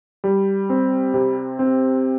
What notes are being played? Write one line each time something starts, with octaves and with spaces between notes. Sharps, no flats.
G3
C4
C3
C4